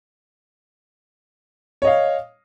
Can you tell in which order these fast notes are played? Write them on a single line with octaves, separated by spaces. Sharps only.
C#5 D#5 F5